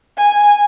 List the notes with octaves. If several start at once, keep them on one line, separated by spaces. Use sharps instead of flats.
G#5